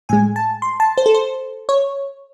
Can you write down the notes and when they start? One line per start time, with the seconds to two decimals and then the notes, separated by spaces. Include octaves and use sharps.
0.09 A2 G#3 G#5
0.36 A5
0.62 C6
0.80 A5
0.98 C5
1.06 A4
1.15 C5
1.69 C#5